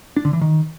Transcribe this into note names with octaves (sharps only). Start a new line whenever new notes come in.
D4
D3
E3
D#3